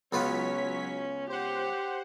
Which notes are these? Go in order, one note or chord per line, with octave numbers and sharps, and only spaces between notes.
C#2 F#3 B3 C#4 F4 C#5 B6
G4 C5 F#5